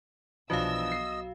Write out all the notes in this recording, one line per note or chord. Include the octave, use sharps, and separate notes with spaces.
B1 E3 F3 D4 F#4 D#5 F5 E6
C7